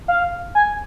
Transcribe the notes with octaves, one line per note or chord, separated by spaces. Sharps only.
F5
G#5